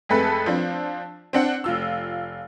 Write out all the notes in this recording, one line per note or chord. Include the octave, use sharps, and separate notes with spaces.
F2 G#3 A3 A4 B4
F3 C4 D4
C4 D4 F#5
F1 F4 E6